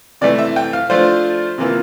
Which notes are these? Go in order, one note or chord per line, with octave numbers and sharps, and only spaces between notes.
C3 E3 A3 D5
E5
G5
F5
F3 A3 D4 F4 C5
C3 E3 A#3 F4